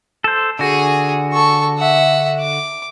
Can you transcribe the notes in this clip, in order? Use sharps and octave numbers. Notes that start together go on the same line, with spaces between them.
A4 C5
D3 F#4 G#4 G#5
A4 C#6
E5 F#5
D6